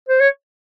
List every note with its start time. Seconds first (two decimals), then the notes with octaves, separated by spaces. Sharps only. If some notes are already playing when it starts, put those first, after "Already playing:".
0.09 C5
0.20 C#5